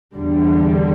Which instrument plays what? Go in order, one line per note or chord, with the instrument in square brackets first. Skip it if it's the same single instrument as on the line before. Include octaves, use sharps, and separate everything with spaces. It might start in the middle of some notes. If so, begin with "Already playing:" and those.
[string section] E2 D3 G3